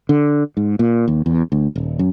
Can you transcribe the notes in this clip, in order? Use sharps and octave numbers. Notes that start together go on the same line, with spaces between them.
D3
G#2
A#2
D#2
E2
D2
D#1
F#2